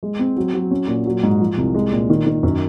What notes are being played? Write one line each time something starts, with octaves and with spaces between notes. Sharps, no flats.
G#3
C4
F#3
F#3
C#4
A#2
F#3
G#2
F3
C2
G#3
A#2
D#3
D#3
F#2